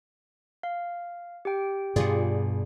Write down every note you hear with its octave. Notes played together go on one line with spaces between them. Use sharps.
F5
G4 G5
G2 B2 F4 G#4 D5